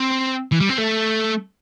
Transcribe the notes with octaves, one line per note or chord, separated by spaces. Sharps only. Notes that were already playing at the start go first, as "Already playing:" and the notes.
Already playing: C4
E3
G3
C4
A3